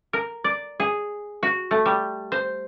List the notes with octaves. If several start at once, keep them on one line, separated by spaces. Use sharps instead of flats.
A#4
D5
G#4
F#4
A3
G3
C5